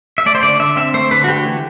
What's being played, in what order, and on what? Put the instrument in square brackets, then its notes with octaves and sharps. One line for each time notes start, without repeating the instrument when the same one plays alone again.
[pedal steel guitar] E5
A3 D5
C5
D3 D5
D3 E5
C4 E5
A3 C5
D3 B4
F#4
A3 G4
E3